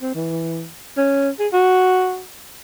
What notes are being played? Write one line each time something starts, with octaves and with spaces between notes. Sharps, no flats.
C4
E3
C#4
G#4
F#4